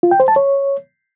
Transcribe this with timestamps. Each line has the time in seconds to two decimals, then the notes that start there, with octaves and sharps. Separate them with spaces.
0.03 F4
0.11 G5
0.20 C5
0.28 A5
0.36 C#5